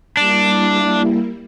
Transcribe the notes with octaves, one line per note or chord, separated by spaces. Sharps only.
G3 A#3 D4 E4